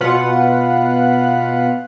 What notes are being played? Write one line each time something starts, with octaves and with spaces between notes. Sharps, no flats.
B2 F4 B4 F#5